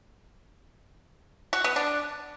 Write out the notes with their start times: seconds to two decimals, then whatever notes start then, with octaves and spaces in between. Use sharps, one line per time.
1.53 F#4
1.64 B3
1.76 D4